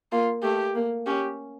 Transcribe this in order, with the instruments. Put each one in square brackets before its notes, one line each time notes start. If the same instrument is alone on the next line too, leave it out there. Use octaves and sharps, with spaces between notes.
[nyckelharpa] A#3 [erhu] F4
[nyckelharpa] A3 [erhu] G4
[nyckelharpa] A#3
[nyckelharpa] C#4 [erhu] G4